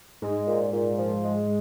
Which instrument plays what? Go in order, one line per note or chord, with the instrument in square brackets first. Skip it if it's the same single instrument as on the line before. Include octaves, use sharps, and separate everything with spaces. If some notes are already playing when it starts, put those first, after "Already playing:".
[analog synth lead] G#2 [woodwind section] G#3
[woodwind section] A#2
A#2
F3
G#3